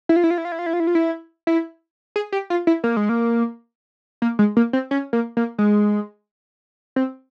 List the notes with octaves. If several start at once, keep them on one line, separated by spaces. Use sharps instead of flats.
E4
F4
E4
F4
E4
F4
E4
F4
E4
F4
E4
F4
E4
E4
G#4
G4
F4
E4
A#3
G#3
A#3
A#3
G#3
A#3
C4
C#4
A#3
A#3
G#3
C4